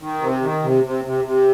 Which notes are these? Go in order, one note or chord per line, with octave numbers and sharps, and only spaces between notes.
D#3
C3
D#3
C3
C3
C3
C3